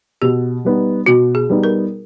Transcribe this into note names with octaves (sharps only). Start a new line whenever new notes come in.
B2 G4
G3 B3 D#4
B2 F#4
G#4
G3 B3 D#4
A#4